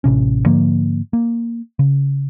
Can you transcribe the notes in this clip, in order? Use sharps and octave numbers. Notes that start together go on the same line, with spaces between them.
A1 C3 C#4
G#2 D3 F3 A#3
A#3
C#3